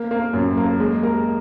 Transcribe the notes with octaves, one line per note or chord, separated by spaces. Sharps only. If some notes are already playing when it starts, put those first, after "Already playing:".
Already playing: A#3
A#3
F#2
A#3
G#3
A#4